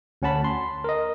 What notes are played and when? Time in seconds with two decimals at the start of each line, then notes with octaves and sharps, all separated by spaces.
0.22 D2 C#4 F#5 A5 B5
0.44 C6
0.84 A#4 D#5